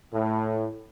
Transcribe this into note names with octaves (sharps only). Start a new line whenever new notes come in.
A2